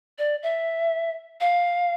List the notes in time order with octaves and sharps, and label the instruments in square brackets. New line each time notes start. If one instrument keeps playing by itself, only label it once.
[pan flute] D5
E5
F5